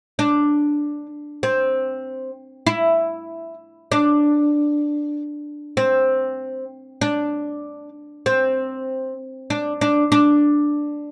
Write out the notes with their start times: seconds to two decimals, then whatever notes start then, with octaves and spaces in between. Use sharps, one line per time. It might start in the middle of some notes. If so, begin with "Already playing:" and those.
0.19 D4
1.43 C4
2.67 E4
3.92 D4
5.77 C4
7.01 D4
8.26 C4
9.50 D4
9.81 D4
10.12 D4